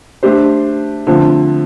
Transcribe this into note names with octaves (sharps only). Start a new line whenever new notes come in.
A3 D4 G4 C5
D3 F3 A3 C4